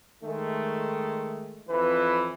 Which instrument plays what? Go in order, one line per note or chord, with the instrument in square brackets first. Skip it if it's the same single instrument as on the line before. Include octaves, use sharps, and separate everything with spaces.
[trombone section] D#3 G#3 A3
F2 E3 B4